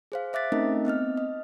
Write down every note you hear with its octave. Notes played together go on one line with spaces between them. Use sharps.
G#4 C5 F5
C5 E5 D6 F#6 A6 B6
A3 C4 C#4 D#4 A#4 D#5
B3 C4 D#5 F6
D#5